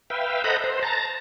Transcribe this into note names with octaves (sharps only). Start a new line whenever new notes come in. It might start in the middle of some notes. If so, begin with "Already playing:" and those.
B4 E5 F5 G5
A4 C5 D#5 F#5 A#5 B5
C5
A5 A#5